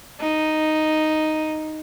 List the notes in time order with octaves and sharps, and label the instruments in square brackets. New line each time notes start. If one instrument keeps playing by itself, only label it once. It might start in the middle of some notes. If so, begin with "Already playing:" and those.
[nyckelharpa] D#4